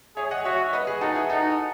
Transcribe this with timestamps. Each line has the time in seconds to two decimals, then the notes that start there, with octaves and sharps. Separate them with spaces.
0.17 G#4 C#5 E5
0.31 D#5 F#5
0.45 F#4 C#5 E5
0.73 B4 D#5
0.87 G#4 B4
1.01 D#4 F#4 A4
1.15 E4 G#4
1.29 D#4 F#4 A4